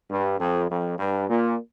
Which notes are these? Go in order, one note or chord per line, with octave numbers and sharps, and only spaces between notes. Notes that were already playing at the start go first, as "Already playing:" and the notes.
G2
F2
F2
G2
A#2